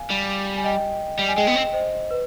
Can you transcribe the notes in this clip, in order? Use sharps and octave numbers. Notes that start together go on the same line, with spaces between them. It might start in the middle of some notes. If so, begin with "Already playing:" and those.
Already playing: F5 G#5
G3
G#5
D#5 G5
G3
G#5
G#3 D#5 G5
B3
C4
C5 D#5
B4